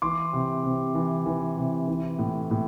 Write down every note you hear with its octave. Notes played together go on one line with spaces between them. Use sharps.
E3 C6 D6
C3
C3
E3
E3
C3
E3
A2
A2